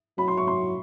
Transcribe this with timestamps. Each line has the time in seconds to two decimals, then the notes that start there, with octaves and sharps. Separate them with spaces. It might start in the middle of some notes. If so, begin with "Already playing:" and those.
0.18 F#3 B5
0.28 C6
0.37 C#6
0.47 C6